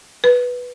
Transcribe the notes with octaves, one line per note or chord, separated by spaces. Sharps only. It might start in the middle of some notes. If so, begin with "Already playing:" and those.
B4